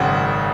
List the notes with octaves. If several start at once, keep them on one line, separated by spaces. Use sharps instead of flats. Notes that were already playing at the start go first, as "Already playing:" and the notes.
Already playing: G#1 F#2 C#3 F#5 G5